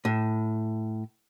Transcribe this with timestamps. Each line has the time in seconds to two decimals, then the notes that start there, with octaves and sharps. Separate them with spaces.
0.05 A2